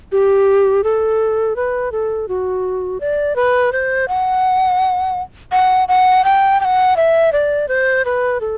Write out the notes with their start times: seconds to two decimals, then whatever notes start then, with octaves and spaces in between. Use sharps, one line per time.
0.12 G4
0.84 A4
1.56 B4
1.92 A4
2.28 F#4
3.00 D5
3.36 B4
3.72 C5
4.08 F#5
5.52 F#5
5.88 F#5
6.25 G5
6.61 G5
6.65 F#5
6.97 E5
7.33 D5
7.69 C5
8.05 B4
8.41 A4